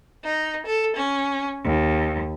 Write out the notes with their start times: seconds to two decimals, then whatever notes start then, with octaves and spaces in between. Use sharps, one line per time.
0.24 D#4
0.66 A4
0.96 C#4
1.64 D#2